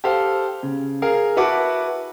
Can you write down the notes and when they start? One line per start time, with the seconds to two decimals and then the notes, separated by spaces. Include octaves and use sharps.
0.04 G4 A4 C5 F5
0.63 C#3
1.02 G#4 A#4 F5
1.36 E4 F#4 B4 F#5 A5 D6